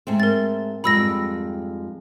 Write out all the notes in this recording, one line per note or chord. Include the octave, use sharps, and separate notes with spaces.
G#2 A3 C4
A#4 A6
F2 G#2 G3 B5 E6 A#6